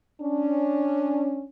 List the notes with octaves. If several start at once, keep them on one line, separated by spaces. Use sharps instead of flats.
C#4 D4